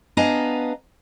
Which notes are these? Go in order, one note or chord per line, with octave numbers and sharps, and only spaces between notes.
B3 D4 D#5 F5 G#5 A#5